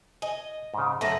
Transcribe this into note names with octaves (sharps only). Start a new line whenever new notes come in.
D#5 G#5
G#2 C#3
F#2 A3 B4 D#5